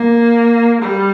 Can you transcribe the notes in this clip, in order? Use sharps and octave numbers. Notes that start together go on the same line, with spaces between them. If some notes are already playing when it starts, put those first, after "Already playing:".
Already playing: A#3
G3